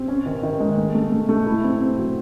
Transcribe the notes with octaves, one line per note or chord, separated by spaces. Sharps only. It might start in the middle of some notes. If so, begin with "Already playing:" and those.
Already playing: C4
C#4
D#3
D#3
G#3
A3
A3
A3
A3
E4
C4
C4
F#3